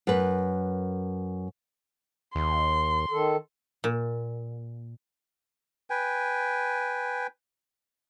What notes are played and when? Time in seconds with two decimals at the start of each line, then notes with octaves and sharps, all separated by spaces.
0.07 F#2 B4
2.35 D#2 C6
3.11 D#3 A4
3.84 A#2
5.90 B4 G5 G#5